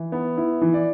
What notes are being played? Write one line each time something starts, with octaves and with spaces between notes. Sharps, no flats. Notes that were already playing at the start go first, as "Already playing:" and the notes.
Already playing: E3
B3
E4
E3
D5